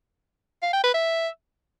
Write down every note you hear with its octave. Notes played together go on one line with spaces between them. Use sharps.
F5
G5
B4
E5